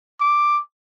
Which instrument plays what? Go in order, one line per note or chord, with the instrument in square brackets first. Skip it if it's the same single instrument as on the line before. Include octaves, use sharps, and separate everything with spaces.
[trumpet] D6